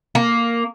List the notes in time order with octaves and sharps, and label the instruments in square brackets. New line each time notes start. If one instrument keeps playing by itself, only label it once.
[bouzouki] A#3